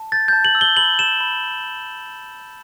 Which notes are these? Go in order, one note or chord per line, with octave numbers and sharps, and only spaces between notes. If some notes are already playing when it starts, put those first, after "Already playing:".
Already playing: A5
G6 A6
G6
A5
F#7
E6
G7
B5 F#7
E6 E7
B5